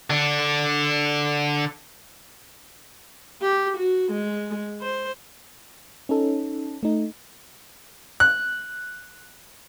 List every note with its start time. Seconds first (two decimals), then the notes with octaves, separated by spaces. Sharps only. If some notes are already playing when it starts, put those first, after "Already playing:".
0.10 D3 D4
3.42 G4
3.77 F#4
4.11 G#3
4.81 C5
6.09 C#4 D#4 A4
6.83 A3 D#4
8.20 F#6